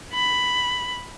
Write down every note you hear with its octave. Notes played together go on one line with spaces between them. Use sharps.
B5